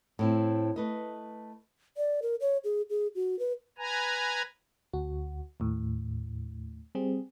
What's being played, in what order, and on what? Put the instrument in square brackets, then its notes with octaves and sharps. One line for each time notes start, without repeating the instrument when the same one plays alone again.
[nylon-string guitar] A2 C4 E4
A3 B4 D#5
[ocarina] D5
A#4
C#5
G#4
G#4
F#4
B4
[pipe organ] B4 G#5 A#5
[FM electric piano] D2 F#4
D#2 A2
G3 C4 G#4